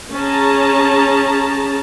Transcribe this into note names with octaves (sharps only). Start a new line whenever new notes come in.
C#4 G#4 A5 A#5